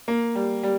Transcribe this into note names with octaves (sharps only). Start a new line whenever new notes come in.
A#3
G3
G3